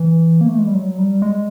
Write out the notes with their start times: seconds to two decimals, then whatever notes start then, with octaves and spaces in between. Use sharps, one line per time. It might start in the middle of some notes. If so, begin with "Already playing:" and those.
Already playing: E3
0.41 A#3
0.49 A3
0.59 G#3
0.67 G3
0.75 F#3
0.98 G3
1.22 G#3